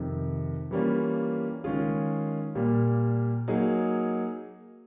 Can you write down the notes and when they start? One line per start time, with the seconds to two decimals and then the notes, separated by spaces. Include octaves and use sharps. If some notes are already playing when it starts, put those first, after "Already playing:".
Already playing: F2 C3 D#3
0.71 E3 G3 A#3 C#4 F4
1.64 D#3 G#3 C#4 F4 G#4
2.55 A#2 G3 A#3
3.48 F#3 A#3 D#4 G#4